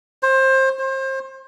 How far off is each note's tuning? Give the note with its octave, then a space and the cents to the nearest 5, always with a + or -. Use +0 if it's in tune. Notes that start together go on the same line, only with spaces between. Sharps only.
C5 +25
C5 +30